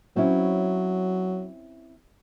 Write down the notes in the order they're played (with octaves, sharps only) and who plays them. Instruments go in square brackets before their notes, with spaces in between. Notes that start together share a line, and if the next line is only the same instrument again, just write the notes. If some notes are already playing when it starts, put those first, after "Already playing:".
[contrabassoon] F#3 [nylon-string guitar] C4 C#4 E4